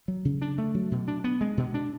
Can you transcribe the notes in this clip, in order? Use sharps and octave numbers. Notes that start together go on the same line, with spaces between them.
F#3
C#3
D4
A3
F#3
B2
D4
B3
G#3
B2
D4